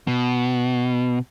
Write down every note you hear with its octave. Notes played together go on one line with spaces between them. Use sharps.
B2